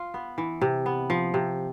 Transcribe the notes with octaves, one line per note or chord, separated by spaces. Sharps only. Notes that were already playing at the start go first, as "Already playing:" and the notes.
Already playing: F4
B3
E3
C3
B3
F3
C3